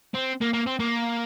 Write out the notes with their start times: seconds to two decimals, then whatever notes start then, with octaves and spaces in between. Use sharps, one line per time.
0.14 C4
0.41 A#3
0.53 A#3
0.66 C4
0.80 A#3